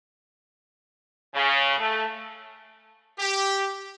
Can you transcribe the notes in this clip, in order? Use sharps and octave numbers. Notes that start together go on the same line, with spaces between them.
C#3
A3
G4